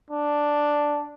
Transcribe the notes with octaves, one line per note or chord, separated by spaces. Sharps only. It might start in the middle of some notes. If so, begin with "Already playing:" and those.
D4